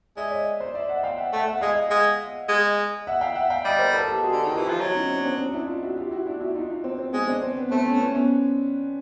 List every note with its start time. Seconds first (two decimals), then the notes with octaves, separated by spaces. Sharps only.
0.17 G#3 D5 E5
0.31 C#5 D#5
0.60 C5 D5
0.74 D5 E5
0.89 E5 F#5
1.03 F5 G5
1.18 E5 F#5
1.32 A3 E5 F#5
1.47 E5 F#5
1.61 G#3 D#5 F5
1.76 D#5 F5
1.91 G#3
2.49 G#3
3.07 E5 F#5
3.21 F5 G5
3.35 E5 F#5
3.50 F5 G5
3.65 G3 D#5 F5
3.79 A#4 C5
3.94 A4 B4
4.08 G4 A4
4.23 F#4 G#4
4.32 D3
4.45 D#3
4.52 E3 F4 G4
4.69 F3
4.81 F#3 E4 F#4
4.95 C#4 D#4
5.09 C4 D4
5.25 C4 D4
5.39 C4 D4
5.53 D4 E4
5.68 D#4 F4
5.83 E4 F#4
5.97 F4 G4
6.11 E4 F#4
6.26 D4 E4
6.40 E4 F#4
6.55 D#4 F4
6.70 D#4 F4
6.84 C4
6.99 C4
7.13 G#3 C4
7.27 C4 D4
7.43 C4
7.57 B3
7.71 A3 C4
7.86 B3 C#4
8.00 B3 C#4
8.15 B3 C#4